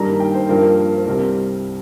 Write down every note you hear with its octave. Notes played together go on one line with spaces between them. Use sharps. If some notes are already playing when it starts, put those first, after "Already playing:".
Already playing: G2 D#3 G3 A#3 A#5
G5
C5
G2 F3 A#3 A#4
A#4
C5
C2 C3 G3 C4 A#4